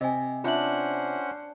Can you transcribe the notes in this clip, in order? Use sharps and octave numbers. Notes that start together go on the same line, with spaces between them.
C3 D#5 G#5
C#4 D4 F4 C5 E5 F#5 F#7